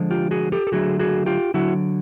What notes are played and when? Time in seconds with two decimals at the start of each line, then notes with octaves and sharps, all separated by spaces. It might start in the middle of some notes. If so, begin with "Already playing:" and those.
Already playing: D3 F3 G#3
0.11 F4 G4
0.31 F#4 G#4
0.52 G4 A4
0.67 A4
0.72 D3 F#3 A3 F#4 G#4
0.99 F#4 G#4
1.26 F4 G4
1.54 D3 F#3 E4 F#4